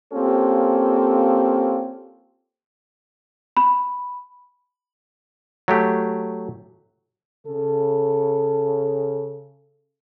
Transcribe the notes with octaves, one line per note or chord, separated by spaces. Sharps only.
A#3 C4 C#4 F4 G4 A4
B5
F#3 A3 G4
C#3 A4